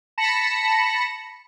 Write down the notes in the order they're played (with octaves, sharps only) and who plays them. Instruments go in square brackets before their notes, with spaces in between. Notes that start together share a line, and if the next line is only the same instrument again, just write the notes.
[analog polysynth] A5 B5 A#6 C#7 E7